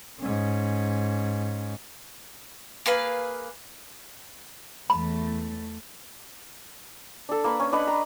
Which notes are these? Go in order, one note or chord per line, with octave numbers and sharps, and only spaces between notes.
G#2 C#4
A#3 G#4 B4 F5
E2 A3 B5
D4 A4
A#3 B4
C#4
D4 B4 D#5 F#5
A#5